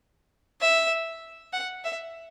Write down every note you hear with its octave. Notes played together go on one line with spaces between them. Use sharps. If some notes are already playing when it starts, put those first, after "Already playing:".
E5
F#5
E5